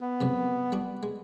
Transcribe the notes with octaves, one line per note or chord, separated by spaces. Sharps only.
B3
C#2 F#2 C3
G3 D4 F#4
G#3